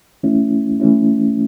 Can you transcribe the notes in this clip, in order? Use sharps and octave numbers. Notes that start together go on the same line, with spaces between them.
E3 A3 C#4 E4
E3 A3 C#4 E4